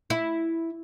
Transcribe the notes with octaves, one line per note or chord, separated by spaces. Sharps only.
E4